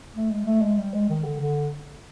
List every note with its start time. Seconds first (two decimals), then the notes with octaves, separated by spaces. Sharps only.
0.15 A3
0.31 G#3
0.46 A3
0.62 G#3
0.78 G3
0.94 G#3
1.10 D#3
1.25 D3
1.41 D3